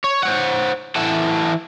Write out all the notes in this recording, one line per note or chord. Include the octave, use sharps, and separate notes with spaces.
C#5
C5 C#5 F#5
E3 E4 A4 F#5 A5